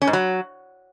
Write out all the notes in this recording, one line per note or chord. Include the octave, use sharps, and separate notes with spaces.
C#4
G#2
F#3